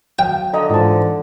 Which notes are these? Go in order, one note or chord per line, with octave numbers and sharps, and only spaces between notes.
F#3 F5 G5
D3 D#5 A#5
G#2 E3 F4 C5 A5